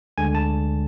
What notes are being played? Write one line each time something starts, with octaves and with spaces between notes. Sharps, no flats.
D2 D3 G#3 G#5
A5